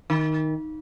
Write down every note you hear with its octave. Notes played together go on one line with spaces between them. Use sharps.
D#3